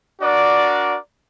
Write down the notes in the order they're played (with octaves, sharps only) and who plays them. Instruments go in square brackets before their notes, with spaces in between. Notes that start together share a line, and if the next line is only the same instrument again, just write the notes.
[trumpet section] D4 F#4 A#4 D5